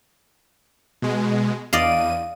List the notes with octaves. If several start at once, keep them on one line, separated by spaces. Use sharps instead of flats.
B2 G#3
E2 D5 D#5 F5 D#7